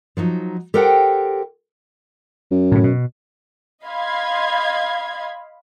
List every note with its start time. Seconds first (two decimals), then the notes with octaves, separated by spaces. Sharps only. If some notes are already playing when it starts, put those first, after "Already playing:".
0.17 F3 F#3 D#4
0.74 G4 A4 A#4 C5 F#5 G5
2.51 F#2
2.72 A2 C3
2.84 B2
3.84 D#5 F5 B5 C6 G#6